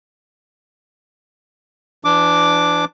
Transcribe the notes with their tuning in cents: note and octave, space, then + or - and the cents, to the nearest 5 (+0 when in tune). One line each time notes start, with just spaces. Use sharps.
E3 +35 D4 +0 D6 +0